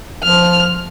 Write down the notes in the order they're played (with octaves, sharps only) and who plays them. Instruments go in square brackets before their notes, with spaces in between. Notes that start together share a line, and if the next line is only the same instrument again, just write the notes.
[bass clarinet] F3 [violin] F6